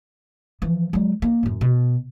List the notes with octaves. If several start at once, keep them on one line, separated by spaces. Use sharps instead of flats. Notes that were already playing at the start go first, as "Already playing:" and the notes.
E3 F3
F#3 G#3
A#3 D#4
F#2 A2
B2